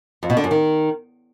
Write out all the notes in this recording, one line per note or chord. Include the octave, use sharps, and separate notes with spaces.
F2
B2
D3
F#2
D#3